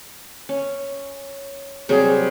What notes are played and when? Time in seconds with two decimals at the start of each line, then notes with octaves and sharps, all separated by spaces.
0.49 C#4
1.89 C3 F#3 G3 G#4